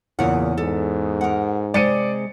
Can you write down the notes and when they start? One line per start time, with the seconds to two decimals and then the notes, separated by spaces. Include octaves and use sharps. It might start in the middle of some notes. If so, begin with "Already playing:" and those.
0.19 E2 A#2 C#3 F#5
0.58 G#2 A4
1.21 A#4 F#5
1.74 C3 G#3 D5 C#7 D#7